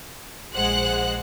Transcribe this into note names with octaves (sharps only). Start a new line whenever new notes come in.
A#1 G#3 C5 F#5 F#6